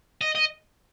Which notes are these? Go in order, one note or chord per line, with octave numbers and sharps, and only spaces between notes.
D#5
D#5